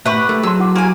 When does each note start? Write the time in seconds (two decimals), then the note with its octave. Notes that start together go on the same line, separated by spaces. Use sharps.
0.06 A2 G4 B4 E5 F#5 A#5 C#6
0.29 A3
0.43 F#3 G#4 A5 C6 E6
0.60 E4 F#5 D6
0.76 A#3 G4 G#5